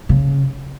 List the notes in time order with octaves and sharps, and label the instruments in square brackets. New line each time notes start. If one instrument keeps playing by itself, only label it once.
[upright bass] C#3